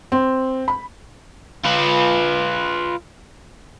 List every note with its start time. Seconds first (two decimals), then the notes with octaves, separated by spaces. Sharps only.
0.12 C4
0.68 B5
1.65 F4 B4